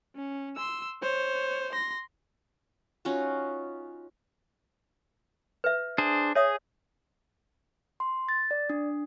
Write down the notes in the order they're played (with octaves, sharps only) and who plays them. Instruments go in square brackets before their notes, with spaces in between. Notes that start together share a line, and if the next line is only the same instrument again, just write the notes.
[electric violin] C#4
C6 E6
C5 C#5
C6 A#6
[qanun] C#4 D#4 F4 F#4
[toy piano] B4 E5
[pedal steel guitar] D4 G#4 C5
[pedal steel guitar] G#4 [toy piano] C#5 E5 D#6
[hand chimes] C6
A6
D5
D4